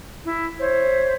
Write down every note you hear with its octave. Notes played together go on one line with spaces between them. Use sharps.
E4
C5 C#5 E5